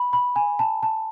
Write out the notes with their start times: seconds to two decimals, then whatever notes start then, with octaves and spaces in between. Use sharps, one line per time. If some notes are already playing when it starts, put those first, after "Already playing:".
Already playing: B5
0.13 B5
0.36 G#5
0.59 A5
0.83 A5